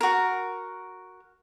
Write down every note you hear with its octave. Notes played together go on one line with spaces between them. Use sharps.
F#4 A#4